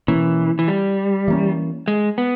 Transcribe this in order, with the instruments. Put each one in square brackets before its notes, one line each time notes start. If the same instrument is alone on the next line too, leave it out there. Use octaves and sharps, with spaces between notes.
[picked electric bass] B2 A#3 C#4 [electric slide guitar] E3
[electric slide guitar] E3
G3
[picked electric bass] E3 A#3 C#4
[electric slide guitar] G#3
B3